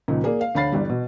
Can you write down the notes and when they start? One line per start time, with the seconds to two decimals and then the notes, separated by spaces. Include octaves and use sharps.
0.08 C#2 A#2 D#3 F3
0.24 A#3 G#4 D5
0.41 F5
0.55 D2 C#5 F5 B5 A6 C7
0.72 G1 E3 G3
0.89 B2